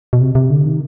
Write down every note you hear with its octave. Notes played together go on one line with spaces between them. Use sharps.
B2
C3
C3
D3
D#3